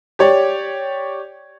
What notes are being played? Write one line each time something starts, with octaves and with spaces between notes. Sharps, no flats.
G4 C#5 D5